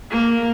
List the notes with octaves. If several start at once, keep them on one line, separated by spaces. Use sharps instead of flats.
A#3